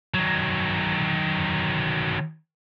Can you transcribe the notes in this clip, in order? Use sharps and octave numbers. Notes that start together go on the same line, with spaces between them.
D#3 F#3